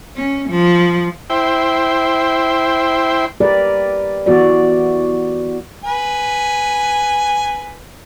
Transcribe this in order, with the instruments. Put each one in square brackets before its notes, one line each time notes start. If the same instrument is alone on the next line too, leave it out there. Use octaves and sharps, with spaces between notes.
[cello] C#4
F3
[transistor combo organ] E4 C5 G5
[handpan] G4 A#4 B4 D5
E3 B3 F#4 D5
[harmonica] B4 G#5